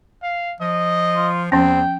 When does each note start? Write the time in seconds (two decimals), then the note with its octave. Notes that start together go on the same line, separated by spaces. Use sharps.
0.23 F5
0.61 F3 D#5
1.16 F4
1.52 E2 F3 C4 C#4 G5